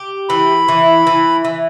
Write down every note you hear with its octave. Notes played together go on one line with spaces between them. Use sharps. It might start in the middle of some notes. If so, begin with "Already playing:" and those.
Already playing: G4
E3 B5
E3
E3
E3